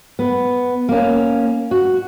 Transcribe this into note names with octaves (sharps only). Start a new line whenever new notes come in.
B3
A#3 C#4
F#4